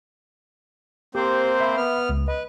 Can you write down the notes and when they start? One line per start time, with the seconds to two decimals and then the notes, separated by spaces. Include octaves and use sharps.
1.15 A#3 C4 G4 C5
1.60 E5 B5
1.77 B3 F6
2.09 C#2
2.28 B4 D#5